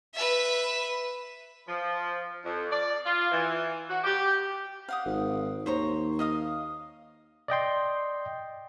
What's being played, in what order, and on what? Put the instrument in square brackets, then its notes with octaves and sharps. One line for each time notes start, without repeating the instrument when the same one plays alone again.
[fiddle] B4 E5
[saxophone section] F3
F2
D5
F4
E3
F#4
G4
[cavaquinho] F5 F#5 D#6
[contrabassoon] G#1
[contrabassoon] D#2 [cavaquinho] C5 C#5 A#5
[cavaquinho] D#5 F5 D#6
[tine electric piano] D5 D#5 G5 C6